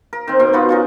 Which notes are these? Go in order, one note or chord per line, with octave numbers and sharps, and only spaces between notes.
A#4
D#3 C4
B2 C4
D#4 F4 F#4 B4
C#4 F4 A#4